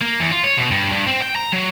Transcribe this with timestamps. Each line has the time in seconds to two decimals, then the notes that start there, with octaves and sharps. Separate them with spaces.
0.02 A#3
0.20 E2
0.32 F4
0.44 C#5
0.58 B2
0.71 G2
0.92 G2
1.07 C4
1.22 G5
1.35 A#5
1.52 F#3